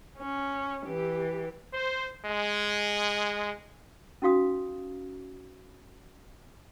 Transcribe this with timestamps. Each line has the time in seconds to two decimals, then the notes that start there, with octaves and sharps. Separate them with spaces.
0.18 C#4
0.86 E3 G4
1.73 C5
2.26 G#3
4.22 C#4 D#4 F#4 F5 D#6